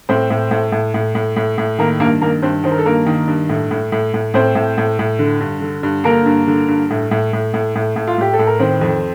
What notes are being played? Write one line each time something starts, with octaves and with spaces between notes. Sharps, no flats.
A2 C4 C5
A2
A2
A2
A2
A2
A2
A2
D#3 A#3 A#4
G2 A#3 A#4
D#3 A#3 A#4
G2 C4 C5
D#3 C5
A#4
A4
G2 A#3 A#4
D#3
G2
A2
A2
A2
A2
A2 C4 C5
A2
A2
A2
D3
G2
D3
G2
D3 A#3 A#4
G2
D3
G2
A2
A2
A2
A2
A2
A2
F4
A2 G4
A4
A2
A#4
D#3 C4 C5
F2